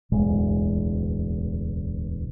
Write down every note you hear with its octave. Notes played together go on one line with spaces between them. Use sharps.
D1 B1 E2 G#3